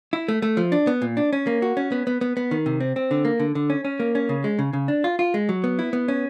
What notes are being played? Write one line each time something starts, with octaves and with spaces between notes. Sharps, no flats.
E4
A3
A3
F3
D4
B3
A#2
D4
C#4
A#3
F#4
C#4
B3
B3
B3
B3
D#3
C3
C4
C4
D3
A#3
D3
D3
C#4
C#4
A#3
C#4
C#3
G#3
C#3
C#3
D4
F4
F4
G#3
F#3
B3
E4
B3
C#4